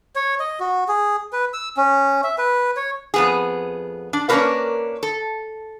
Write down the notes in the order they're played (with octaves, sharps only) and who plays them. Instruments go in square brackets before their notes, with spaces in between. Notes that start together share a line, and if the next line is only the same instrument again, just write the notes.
[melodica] C#5
D#5
F#4
G#4
B4
E6
C#4
E5
B4
C#5
[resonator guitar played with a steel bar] F2 B3 G#4
D4
A#3 C#4 D4 F4 A#4 B4
A4